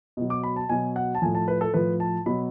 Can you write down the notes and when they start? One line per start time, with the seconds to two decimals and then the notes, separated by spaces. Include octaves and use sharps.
0.17 B2 F#3
0.30 D6
0.44 B5
0.56 A5
0.69 B2 F#3 G#5
0.96 F#5
1.15 A5
1.22 A2 F3 G#5
1.35 A5
1.48 B4
1.61 A4
1.74 A2 F3 B4
2.00 A5
2.26 B2 F#3 B5